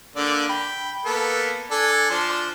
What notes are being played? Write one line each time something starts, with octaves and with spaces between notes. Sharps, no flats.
D3 A#3 D5
G5 B5
A#3 B3 A4
D4 A4 G#5
F3 D4 C5